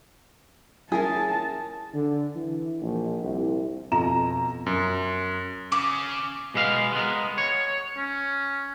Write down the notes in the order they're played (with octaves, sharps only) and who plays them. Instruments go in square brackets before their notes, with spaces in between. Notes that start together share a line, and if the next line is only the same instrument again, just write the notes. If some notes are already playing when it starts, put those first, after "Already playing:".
[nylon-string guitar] C#4 E4 A#4 [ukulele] G#4 [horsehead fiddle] A5
[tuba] D3
E3
A#1
C2
[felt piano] F2 B2 F4 A#5 E7
[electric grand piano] F#2
[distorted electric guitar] C#3 [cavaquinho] D6
[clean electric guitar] B2 G#3 B3 E5 F5
G#3 B3 A#4
C#5
[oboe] C#4